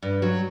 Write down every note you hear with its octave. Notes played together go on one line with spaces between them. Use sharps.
G2
F#3